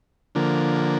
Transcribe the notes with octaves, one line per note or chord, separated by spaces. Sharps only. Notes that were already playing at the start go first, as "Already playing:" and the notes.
D3 F3 A#3